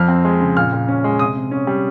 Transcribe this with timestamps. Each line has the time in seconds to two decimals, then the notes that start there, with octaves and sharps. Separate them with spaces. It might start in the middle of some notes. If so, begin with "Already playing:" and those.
Already playing: F2 F6
0.08 C4
0.25 G#3
0.41 C#3
0.56 A#2 F6
0.73 A#2
0.88 C#4
1.04 G#3
1.19 C3 D#6
1.36 C3
1.51 C#4
1.67 G3